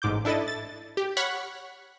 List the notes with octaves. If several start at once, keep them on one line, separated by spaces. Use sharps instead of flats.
A1 G#2 D6 G6
D4 E4 A4 D#5 A6
A6
G4
C#5 F#5 B5 C#6 F6 B6